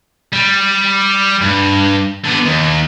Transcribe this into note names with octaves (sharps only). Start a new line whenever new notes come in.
G3
G2
D3 B3
D#2